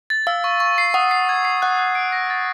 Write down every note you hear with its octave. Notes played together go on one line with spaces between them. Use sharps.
A6
F5 E6
C#6
C#6
C7
F#5 D#6
C7
G#6
C7
F#5 F#6
F#6
D7
A#6
A6